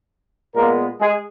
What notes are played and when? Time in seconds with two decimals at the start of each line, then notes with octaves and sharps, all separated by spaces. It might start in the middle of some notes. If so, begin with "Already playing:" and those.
0.55 A#2 G#3 A#3 B3 A#4
1.00 G#3 G#4